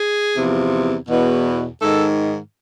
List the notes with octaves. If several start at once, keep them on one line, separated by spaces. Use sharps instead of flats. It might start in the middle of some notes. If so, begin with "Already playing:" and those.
Already playing: G#4
E2 C3 F3
E2 B2
G#2 D#3 A4